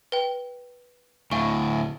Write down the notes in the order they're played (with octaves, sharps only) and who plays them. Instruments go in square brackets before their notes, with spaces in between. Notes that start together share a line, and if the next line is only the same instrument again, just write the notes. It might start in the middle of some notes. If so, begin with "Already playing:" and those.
[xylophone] B4 G5
[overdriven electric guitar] D2 A2 [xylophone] F5 G#5 C#6